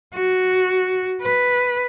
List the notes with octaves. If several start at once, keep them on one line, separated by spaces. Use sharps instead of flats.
F#4
B4